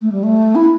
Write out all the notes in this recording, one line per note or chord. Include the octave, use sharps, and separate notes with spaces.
A3
G3
A3
E4